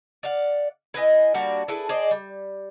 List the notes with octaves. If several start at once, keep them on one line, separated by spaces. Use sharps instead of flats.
D5 F5 F#5
E4 B4 D#5 G#5
G3 A#3 D4 F#4
E4 G#4 A4 B4
G#4 C5 D5 D#5
G3